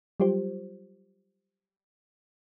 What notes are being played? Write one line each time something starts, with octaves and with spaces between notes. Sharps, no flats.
F#3 G3 F4 G4 C5